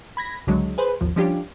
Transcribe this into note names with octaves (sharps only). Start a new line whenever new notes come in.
B5 G#6 A#6
C#2 D3 F#3 G#3
G#4 B4 C5
G#1 D#2 F3
F3 G3 C#4 D4 F4 G4